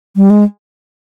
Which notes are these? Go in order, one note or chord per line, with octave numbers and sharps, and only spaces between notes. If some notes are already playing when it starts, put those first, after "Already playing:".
G3
G#3